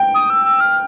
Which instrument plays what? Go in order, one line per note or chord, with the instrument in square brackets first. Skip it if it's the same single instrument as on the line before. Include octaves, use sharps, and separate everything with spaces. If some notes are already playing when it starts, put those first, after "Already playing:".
Already playing: [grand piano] G5
[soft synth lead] D#6
E6
E6
F6